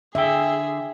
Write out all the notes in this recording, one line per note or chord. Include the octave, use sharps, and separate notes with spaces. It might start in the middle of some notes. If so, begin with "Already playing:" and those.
D3 G#4 E5 G5